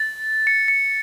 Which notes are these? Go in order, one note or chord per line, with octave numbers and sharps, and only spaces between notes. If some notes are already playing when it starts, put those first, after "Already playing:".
Already playing: A6
C#7
C#7